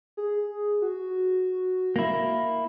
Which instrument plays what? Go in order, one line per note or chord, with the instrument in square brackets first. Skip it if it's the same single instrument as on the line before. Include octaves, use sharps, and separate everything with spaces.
[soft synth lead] G#4
F#4
[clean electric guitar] A#3 E4